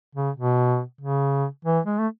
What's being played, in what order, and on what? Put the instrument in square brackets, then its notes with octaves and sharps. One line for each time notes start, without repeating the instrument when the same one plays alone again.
[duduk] C#3
B2
C#3
E3
G#3
A3